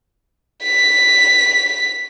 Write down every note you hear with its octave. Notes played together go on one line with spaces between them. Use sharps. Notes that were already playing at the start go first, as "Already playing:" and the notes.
B6